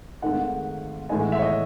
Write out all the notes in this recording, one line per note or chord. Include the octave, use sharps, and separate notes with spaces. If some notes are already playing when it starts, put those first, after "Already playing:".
G#1 G#2 D#3 A3 D#4 F#5
A2 E3 G#3 D#4 G#5
F#5
E5
C#5
D#5